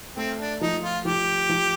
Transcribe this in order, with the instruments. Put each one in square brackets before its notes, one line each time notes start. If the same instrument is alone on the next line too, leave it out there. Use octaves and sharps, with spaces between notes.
[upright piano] A3 [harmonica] C4
[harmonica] D4
[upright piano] F3 [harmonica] D#4
[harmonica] F4
[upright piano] F3 [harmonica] G4
[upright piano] F3